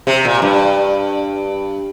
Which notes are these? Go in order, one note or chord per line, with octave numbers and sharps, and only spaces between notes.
C3
A#2
G2